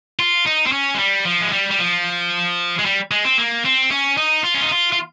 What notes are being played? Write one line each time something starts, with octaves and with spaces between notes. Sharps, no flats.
F4
D#4
C4
C#4
G#3
G3
F3
G#3
G3
G3
F3
G#3
G3
G#3
C4
A#3
C4
C#4
D#4
F4
C#4
D#4
F4
F4